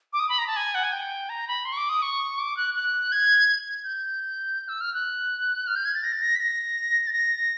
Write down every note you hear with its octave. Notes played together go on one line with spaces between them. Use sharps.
D6
D#6
B5
A#5
A5
G#5
F#5
G#5
G5
A#5
B5
C6
C#6
D6
D#6
C#6
D6
F#6
F#6
G#6
G6
E6
F6
F#6
F6
G6
G#6
A6
A#6
A6
A#6
B6
A#6
A6
A#6